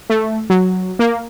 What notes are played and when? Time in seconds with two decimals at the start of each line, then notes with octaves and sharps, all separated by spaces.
0.10 A3
0.50 F#3
0.99 A#3